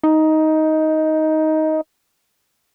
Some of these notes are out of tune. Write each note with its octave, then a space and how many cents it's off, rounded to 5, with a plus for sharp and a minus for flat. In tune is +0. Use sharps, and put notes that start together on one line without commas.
D#4 +10